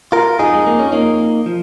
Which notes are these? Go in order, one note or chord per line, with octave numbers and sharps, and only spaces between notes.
F4 A#4
F2 F3 D#4 G#4
G#3
A#3
C#4
A#3 D#4
F3